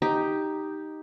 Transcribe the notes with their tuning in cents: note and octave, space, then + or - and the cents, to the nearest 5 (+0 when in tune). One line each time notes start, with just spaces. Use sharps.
D#4 +0 G4 +0